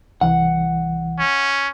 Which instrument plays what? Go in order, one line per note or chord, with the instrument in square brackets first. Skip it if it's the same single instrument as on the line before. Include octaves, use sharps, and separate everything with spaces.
[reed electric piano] C2 E3 [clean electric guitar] F#5
[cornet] C#4